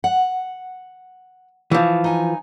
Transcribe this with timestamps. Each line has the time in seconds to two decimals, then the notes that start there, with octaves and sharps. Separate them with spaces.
0.04 F#5
1.71 E3 F3
2.04 D#4 G#5